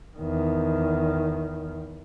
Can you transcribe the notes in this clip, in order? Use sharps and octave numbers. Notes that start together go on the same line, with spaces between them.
E2 D#3